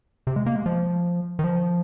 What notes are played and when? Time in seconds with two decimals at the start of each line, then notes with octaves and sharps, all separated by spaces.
0.27 C3
0.36 G#3
0.46 A#3
0.56 G#3
0.66 F3
1.39 D#3
1.44 F3